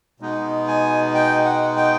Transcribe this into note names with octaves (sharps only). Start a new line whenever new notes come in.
B2 G#3 B3 D#4
G#5
G5
F#5
G5